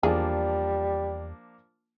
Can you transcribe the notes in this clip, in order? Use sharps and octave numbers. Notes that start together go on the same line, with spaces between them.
E2 F3 G3 A#3 D4 G#4